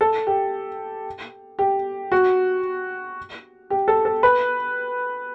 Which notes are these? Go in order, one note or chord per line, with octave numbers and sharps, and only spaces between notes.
A4
G4
G4
F#4
G4
A4
A4
B4